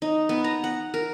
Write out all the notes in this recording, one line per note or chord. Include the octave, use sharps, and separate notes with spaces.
D#4
B3
A#5
F#5
A#4